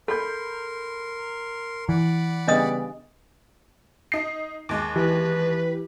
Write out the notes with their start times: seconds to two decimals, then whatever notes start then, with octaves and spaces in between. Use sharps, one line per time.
0.08 A4 A#4 B5 C6 G6
1.89 E3 D5 F#5 B5
2.48 C#3 G3 B3 D4 D#5 D#6
4.12 D#4 C7
4.69 D#2 G#3 D6
4.96 E3 G4 B4